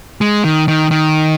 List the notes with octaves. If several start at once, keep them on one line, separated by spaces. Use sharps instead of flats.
G#3
D#3
D#3
D#3